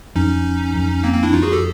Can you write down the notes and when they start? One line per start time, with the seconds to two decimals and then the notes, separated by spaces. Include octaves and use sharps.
0.15 F2 C#4 D#4
0.75 F2
1.04 A#3 C4
1.14 A#3 C4
1.23 D4 E4
1.33 F2 D#4 F4
1.42 F#4 G#4
1.52 G4 A4